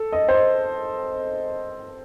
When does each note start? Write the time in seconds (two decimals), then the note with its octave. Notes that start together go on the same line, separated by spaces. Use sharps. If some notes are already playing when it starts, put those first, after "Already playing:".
Already playing: A4
0.12 D#5
0.29 C5
0.33 D#5